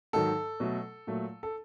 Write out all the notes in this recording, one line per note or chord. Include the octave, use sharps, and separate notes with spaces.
G#2 D#3 F#3 A4
B2 F#3 A3
A#2 F#3 A3
A4